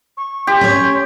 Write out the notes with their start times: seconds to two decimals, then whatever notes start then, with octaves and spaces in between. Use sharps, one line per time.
0.17 C#6
0.47 G4 C6
0.61 C#4 C#5